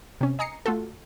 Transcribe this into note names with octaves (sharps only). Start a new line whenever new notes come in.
C3 C#4
D#5 G#5 A#5 D#6 C7 C#7
A3 F4 F#4 A4